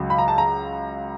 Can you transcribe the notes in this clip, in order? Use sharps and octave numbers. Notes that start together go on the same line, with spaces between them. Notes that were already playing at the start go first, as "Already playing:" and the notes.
Already playing: C#2 C#3 F#3
B5
A#5
A5
A#5